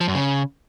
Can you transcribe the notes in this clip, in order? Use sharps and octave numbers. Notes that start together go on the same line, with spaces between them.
F3
F#2
C#3